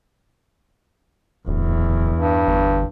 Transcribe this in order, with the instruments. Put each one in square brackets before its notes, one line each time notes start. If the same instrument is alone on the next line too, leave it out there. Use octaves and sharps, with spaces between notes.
[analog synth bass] D1 [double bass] E2
[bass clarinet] G2
[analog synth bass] G1